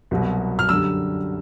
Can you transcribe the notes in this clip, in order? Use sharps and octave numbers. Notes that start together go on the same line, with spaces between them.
C2 B2 F#3
F6
F#2 D3 G3 E6